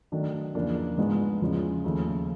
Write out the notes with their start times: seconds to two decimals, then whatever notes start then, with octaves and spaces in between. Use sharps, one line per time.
0.12 D#3 F#3 A3 D4
0.55 E2 C#3 F3 A#3 D4
0.98 G#2 F3 G#3 B3 D4
1.41 E2 C#3 F3 G#3 C#4
1.84 D#2 C#3 F3 A3